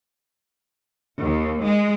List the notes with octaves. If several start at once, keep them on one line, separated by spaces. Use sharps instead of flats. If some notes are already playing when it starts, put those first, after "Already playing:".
D#2
G#3